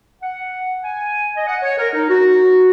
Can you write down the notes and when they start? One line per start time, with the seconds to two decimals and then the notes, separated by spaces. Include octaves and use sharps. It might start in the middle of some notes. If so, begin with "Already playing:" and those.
0.21 F#5
0.84 G#5
1.37 D#5
1.47 F#5
1.63 C#5
1.78 A#4
1.94 D#4
2.09 F#4